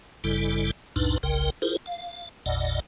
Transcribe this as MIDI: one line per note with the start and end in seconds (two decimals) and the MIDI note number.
0.24 0.71 32
0.24 0.71 43
0.24 0.71 49
0.24 0.71 55
0.24 0.71 64
0.24 0.71 69
0.96 1.18 36
0.96 1.18 41
0.96 1.18 45
0.96 1.18 62
0.96 1.18 63
0.96 1.18 71
1.23 1.50 31
1.23 1.50 36
1.23 1.50 49
1.23 1.50 70
1.23 1.50 79
1.62 1.77 64
1.62 1.77 65
1.62 1.77 68
1.62 1.77 70
1.62 1.77 72
1.86 2.29 77
2.46 2.80 33
2.46 2.80 40
2.46 2.80 46
2.46 2.80 74
2.46 2.80 75
2.46 2.80 78